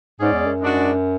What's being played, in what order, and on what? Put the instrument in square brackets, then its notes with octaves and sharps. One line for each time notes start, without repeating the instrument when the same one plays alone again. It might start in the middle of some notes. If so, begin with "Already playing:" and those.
[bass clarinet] G#2 [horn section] G#3 C#4 G#4 D5
[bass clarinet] E2
F#2
[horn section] G#2 G#3 D4 F#4